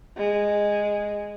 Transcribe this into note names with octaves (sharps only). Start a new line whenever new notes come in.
G#3